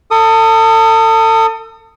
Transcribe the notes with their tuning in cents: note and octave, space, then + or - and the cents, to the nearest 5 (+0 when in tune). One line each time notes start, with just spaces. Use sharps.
A4 +35 D#6 +0